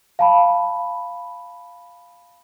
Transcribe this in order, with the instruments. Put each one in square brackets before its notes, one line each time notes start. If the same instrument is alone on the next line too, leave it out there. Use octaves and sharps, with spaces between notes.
[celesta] F5 A5 B5